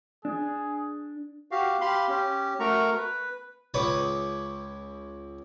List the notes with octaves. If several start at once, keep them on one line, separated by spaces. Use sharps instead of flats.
D4 G#4
F#4 G4 F5
G4 F5 B5 C6
C#4 G4
A3 F#4 A#4 A#5 C#6
B4
C#2 B4 C#5 D6 D#6